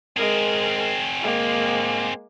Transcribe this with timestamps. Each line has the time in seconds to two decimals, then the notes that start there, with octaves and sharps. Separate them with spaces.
0.17 G#3 C4 G#4 A#4
1.22 G#3 A#3